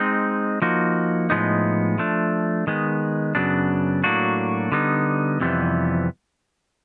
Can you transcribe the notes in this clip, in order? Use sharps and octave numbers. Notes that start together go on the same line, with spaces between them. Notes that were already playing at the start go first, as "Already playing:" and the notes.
Already playing: G#3 C4 D#4
F3 A#3 D#4 F#4
A2 F3 G#3 B3 D#4
F3 A3 D4
D#3 G#3 B3
F#2 C#3 F#3 B3 D4
A2 F#3 A#3 D4 F#4
D3 G3 B3 D#4
F2 C3 E3 G3 B3